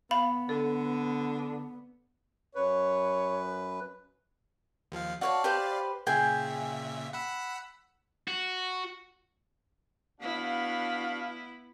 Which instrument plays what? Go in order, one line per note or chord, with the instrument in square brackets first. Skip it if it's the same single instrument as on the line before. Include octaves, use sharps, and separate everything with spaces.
[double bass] B3 [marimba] F5 [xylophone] B5
[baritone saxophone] D3 [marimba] A4
[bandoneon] F#2 B4 [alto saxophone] C#5
[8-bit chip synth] D#2 F3 F5
[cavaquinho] F#4 C#5 A5 [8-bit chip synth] D5 F5
[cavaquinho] G4 B4 C5
[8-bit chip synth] A#2 C#3 E5 [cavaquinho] G#4 G5 G#5
[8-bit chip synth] F#5 B5 E6
[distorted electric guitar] F#4
[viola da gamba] B3 E4 [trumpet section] D4 F#4 F5